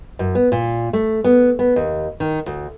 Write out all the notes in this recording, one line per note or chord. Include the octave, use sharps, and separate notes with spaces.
F#2
B3
A#2
A3
B3
B3
D#2
D#3
D2